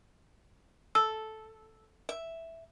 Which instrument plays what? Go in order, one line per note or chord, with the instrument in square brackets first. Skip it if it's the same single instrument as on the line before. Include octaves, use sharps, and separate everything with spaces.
[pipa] A4 [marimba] E6
[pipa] E5